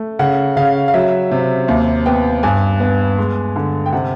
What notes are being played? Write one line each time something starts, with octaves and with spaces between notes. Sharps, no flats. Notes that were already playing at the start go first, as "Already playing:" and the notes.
Already playing: A3
C#3 F#5
C#3 F5
F5
F#3 E5
C3
D#2
B3 G5
G2 G#5
B3
G#3
D3
G5
C3 F#5